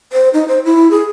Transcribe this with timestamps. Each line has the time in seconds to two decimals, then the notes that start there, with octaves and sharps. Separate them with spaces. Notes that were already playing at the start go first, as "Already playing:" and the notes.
0.13 C5
0.34 D#4
0.48 C5
0.65 E4
0.91 G#4